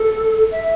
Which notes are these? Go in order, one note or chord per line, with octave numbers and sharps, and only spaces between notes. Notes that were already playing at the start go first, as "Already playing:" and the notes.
Already playing: A4
E5